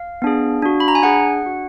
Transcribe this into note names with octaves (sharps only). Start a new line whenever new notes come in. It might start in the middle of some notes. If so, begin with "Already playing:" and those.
Already playing: F5
B3 D4 G#4
D4 F#4
B5
A#5
G#5
D4 G#4 F#5
D4 F#4